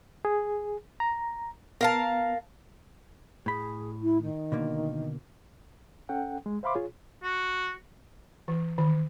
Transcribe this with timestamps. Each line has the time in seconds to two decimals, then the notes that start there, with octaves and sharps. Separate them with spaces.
0.25 G#4
1.00 A#5
1.81 B3 A#4 F5 A5
3.46 A2 G#4 B5
4.02 E4
4.22 D#3
4.52 B2 D3 A#3
6.09 C#4 A4 F#5 G5
6.46 G#3
6.63 C5 E5 F5 B5 C6 D6
6.75 F4 G#4 C#5
7.23 F#4
8.48 E3
8.78 D#3